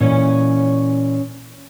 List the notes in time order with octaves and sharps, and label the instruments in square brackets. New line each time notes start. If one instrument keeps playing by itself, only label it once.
[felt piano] A#2 E3 [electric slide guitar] C#4 C#5